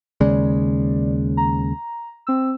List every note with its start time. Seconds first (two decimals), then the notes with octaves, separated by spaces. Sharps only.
0.21 D#2 C#3 G#3 D5
1.37 A#5
2.27 C4 E6